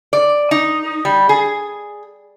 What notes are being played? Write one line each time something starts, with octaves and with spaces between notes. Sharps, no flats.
D5
D#4
G3
G#4